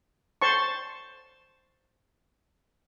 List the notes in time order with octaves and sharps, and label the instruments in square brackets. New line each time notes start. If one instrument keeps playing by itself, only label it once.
[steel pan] C5 A5 C6 C#6